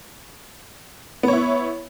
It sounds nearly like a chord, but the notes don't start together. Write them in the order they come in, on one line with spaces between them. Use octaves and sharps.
B3 C#5 E4